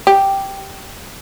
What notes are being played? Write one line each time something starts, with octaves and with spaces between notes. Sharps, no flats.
G4